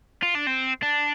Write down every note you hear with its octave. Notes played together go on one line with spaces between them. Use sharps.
F4
D4
C4
D4